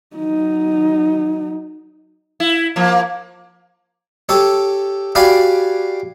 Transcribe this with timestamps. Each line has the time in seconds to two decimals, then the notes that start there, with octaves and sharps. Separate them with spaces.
0.16 F#3 D#4
2.40 E4
2.76 F3 A#3
4.29 G4 A4 C#5
5.15 F#4 G4 D5 F5 G#5 B5